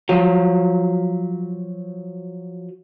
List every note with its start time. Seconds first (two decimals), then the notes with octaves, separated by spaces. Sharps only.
0.09 F3 F#3